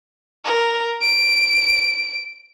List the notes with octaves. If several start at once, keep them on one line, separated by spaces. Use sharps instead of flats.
A#4
D7